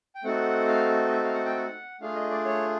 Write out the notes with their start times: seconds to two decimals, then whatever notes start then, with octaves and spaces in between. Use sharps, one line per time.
0.15 G5
0.24 A3 C4 D#4 F#4 A4 F#5
0.68 F5
1.07 D#5
1.12 E5
1.24 F5
1.34 F#5
1.46 G5
1.57 F#5
2.01 A3 D4 F4 G#4 F5
2.15 D#5
2.30 D5
2.45 C#5